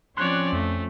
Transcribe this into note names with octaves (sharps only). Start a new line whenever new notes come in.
F3 C4 C#4 C#5 D5 C6 F#6
F2 A3